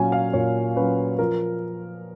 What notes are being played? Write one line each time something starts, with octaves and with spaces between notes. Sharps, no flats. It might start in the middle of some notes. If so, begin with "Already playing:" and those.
Already playing: A#2 F#3 C#4 F5 G#5
F5
A#2 C#5
F#3 C#4 B4
F3 A#4